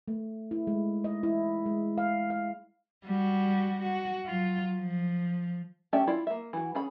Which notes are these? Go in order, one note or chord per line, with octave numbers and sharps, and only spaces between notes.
A3
E4
G#3
D#5
E4
G#3
F5
F5
G3 F#4
F#4
F#3 F4
F3
A3 C#4 G4 D5 E5
E4 F4 D5
A#3 E5
E3 F#4
C#4 G#4 B5